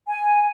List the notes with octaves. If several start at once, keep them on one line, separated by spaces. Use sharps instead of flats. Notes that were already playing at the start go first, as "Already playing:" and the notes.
G#5